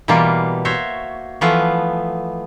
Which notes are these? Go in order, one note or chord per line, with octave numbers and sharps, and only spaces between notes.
B2 E3 G3 A#3 F4
F#4 C5 C#5 E5
E3 F3 A3 B3 F4